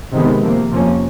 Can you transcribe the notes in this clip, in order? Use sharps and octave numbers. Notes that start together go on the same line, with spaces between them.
C3 D#3 G#3 B3
C3 F3 A#3
F2 C3 F3 A#3 C#4